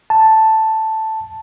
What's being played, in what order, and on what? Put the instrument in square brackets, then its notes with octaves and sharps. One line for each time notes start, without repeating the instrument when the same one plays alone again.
[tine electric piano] A5